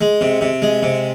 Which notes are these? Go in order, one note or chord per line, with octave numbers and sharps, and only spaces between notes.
G#3
C3
C3
G#3
C3